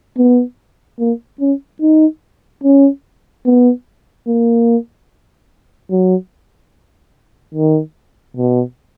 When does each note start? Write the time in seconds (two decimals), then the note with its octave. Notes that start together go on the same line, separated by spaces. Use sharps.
0.18 B3
1.00 A#3
1.40 C#4
1.82 D#4
2.64 C#4
3.46 B3
4.27 A#3
5.91 F#3
7.55 D#3
8.37 B2